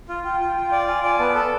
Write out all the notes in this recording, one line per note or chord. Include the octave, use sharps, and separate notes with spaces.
F4
F4 G5
F4
F4
D5
F4 G#5
D5 G#5
B3 A5
A4 A5